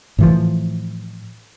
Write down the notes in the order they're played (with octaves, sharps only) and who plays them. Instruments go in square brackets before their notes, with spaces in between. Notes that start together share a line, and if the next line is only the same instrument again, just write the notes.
[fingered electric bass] A2 E3 F3